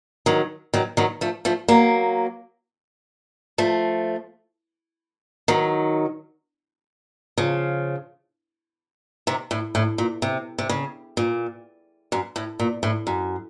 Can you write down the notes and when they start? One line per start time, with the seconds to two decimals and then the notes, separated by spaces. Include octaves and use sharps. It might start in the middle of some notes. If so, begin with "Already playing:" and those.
0.26 D#3 F#3
0.74 D#3 F#3
0.97 D#3 F#3
1.21 F3 A3
1.45 F3 A3
1.68 F#3 A#3
3.58 F3 A3
5.48 D#3 F#3
7.38 C#3 F3
9.27 C3 D#3
9.51 A2
9.75 A2
9.98 A#2
10.22 C3
10.58 C3
10.69 C#3
11.17 A#2
12.12 F#2
12.36 A2
12.60 A#2
12.83 A2
13.07 F#2